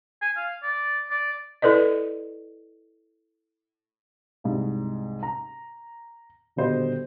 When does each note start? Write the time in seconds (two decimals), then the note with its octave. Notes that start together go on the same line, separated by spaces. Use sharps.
0.22 G#5
0.36 F5
0.63 D5
1.11 D5
1.62 E4 A4 B4 D5 D#5
4.44 C2 G#2
5.23 A#5
6.56 D#1 B2 D3 G4 C5 D#5